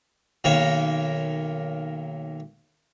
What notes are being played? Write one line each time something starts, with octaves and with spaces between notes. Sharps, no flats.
B1 D#3 A#3 C#5